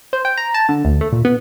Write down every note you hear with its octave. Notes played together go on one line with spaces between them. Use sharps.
C5
G5
A#5
A5
D3
D2
A3
A#2
B3